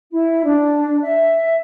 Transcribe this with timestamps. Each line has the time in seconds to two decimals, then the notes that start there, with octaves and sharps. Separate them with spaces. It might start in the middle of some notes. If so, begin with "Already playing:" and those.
0.10 E4
0.44 D4
1.02 E5